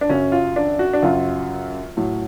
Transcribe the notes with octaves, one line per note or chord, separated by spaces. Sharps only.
D4
F#2 C#3 F#3 C#4
F4
D4
F#4
D4
F#2 C#3 F#3 F4
A2 F#3